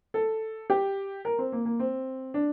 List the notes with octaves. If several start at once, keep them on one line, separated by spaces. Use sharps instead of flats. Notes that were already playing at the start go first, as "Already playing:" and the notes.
A4
G4
A#4
C4
A#3
A#3
C4
D4